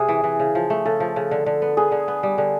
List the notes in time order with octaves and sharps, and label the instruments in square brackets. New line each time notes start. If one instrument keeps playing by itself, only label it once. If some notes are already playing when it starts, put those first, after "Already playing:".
Already playing: [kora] C3 [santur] G#4
[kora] E3
E3
C#3
F3
A3
[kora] C#3 [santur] A4
[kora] F3
C#3
D3
D3
B3
[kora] B3 [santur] G#4
[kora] D3
B3
G3
D3